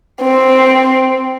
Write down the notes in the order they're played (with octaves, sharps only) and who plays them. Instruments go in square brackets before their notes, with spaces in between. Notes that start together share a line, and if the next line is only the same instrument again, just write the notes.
[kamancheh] C4